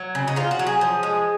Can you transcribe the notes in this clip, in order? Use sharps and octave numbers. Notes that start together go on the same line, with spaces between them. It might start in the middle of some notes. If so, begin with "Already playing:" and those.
Already playing: F#3
C#3
D#4
C#3 F4
F#4
F#3
G#4
F3
G#3